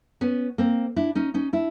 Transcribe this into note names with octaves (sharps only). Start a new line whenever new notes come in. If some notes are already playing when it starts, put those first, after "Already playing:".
B3 C#4
A#3 C4
D4 E4
C#4 D#4
C#4 D#4
D4 E4